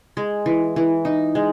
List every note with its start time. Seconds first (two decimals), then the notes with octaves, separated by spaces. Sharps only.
0.17 G#3
0.46 E3
0.76 E3
1.05 D#4
1.35 G#3